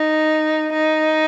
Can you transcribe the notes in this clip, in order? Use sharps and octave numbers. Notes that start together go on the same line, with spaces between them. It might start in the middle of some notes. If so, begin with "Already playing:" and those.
Already playing: D#4
D#4